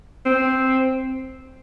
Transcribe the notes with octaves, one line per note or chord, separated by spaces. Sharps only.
C4